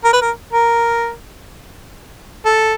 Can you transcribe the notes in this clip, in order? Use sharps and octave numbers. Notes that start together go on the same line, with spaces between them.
A#4
B4
A#4
A#4
A4